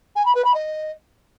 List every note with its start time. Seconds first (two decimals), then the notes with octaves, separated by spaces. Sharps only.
0.16 G#5
0.25 B5
0.35 B4
0.45 B5
0.54 D#5